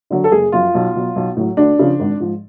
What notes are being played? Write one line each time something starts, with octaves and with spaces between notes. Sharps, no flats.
D3 F#3
A4
F#1 G#4
F#2 F3 F4
B1
B2 F#3
B1
A2 F#3
D2 D4
C#3 F3
G#1
G#2 F3